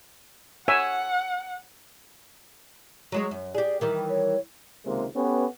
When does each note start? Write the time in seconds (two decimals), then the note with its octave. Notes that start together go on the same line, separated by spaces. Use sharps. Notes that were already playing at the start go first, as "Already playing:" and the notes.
0.68 C#5 E5 F#5 G#5
3.12 F#3 G#3 C#5
3.31 F#2
3.55 G4 G#4 D5
3.81 D#3 E3 G3 A#4
4.09 C#5
4.86 C#2 C3 D#3 G#3 A#3
5.16 B3 C#4 G4 A4 B4